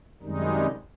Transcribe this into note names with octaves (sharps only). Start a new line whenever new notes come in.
F#2 C3 D#3 G3 G#3 D#4